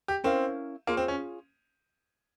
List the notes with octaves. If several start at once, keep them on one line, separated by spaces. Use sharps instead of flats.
G4
C4 C#4 E4 A#4 F5
A#3 F4 G#4 C#5
C4
C#4